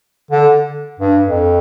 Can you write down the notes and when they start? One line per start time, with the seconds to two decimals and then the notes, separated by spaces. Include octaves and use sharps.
0.31 D3
1.00 G2
1.23 F2